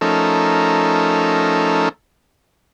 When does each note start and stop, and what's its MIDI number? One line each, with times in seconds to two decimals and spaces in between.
0.01 1.89 53
0.01 1.89 57
0.01 1.89 61
0.01 1.89 63
0.01 1.89 69
0.01 1.89 70